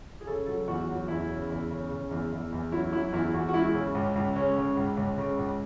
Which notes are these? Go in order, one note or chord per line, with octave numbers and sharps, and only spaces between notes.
G#4
C#3 A4
F#3 A4
E2 F#4
F#3 F#4
E2 E4
C#3
E2
C#3
C#3
E2
E2
E2
F#3 E4
F#3 E4
E2 E4
E2 F#4
F#4
G#3 E4
C#3
C#2
C#2
G#3 C#4
C#3
C#2
C#2
C#3
C#2